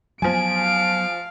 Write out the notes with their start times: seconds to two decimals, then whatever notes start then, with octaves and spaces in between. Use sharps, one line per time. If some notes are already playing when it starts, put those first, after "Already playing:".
0.22 F3 F#3 B3 G#5 D7
0.57 F5